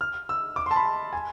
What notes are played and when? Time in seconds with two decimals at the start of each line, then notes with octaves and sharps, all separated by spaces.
0.01 F6
0.29 E6
0.56 D6
0.66 C6
0.71 A5
0.76 B5
1.13 G#5